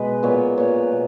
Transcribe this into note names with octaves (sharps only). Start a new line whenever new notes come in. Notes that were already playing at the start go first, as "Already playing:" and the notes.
Already playing: B2 G#3 B4 D#5
A#2 F#3 B3 C#5
A#2 F#3 B3 C#5
B2